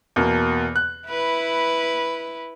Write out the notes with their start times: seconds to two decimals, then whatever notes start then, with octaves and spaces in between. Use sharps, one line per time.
0.16 E2 B2 A#3
0.76 F#6
1.09 E4 B4